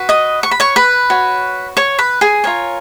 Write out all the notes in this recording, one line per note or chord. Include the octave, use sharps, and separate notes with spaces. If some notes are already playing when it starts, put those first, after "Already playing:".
Already playing: F#4 B4
D#5 D#6
C#6
B5
C#5 C#6
B4 B5
F#4 C#5
C#5 C#6
B4 B5
G#4 G#5
F4 A#4 C#5